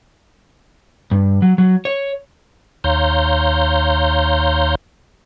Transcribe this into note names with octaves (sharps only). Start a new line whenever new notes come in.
G2
F#3
F#3
C#5
D#2 C#5 F5 A#5 C6 G6